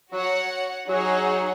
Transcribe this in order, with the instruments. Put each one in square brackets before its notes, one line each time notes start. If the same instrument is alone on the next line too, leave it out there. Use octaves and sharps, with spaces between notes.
[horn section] F#3 [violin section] F#4 C#5 F#5
[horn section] F#3 [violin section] D#4 G#4 C#5 F#5